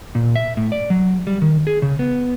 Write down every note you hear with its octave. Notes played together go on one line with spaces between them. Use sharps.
A#2
E5
A2
D5
F#3
G3
D#3
G#4
C#3
B3